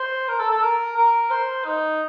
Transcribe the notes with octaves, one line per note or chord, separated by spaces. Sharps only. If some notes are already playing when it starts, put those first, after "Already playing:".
Already playing: C5
A#4
A4
A4
A#4
A#4
C5
D#4